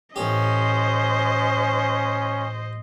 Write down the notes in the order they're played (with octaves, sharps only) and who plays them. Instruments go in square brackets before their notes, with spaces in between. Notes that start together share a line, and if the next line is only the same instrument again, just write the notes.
[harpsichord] A1 G4 [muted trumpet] C#4 [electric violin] C5 D#5